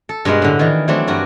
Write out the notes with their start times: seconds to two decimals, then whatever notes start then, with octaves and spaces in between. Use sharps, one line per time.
0.09 A4
0.25 G2 B2 G#3 A#4 F#5
0.42 A2 D3
0.59 D#3 E3
0.88 E3 F#3 A3 C4 D4
1.07 G2 F#4 A#4 D5